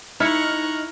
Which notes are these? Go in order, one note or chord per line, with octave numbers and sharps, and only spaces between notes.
D#4 E4 A#5 C#6 F6 F#6 C#7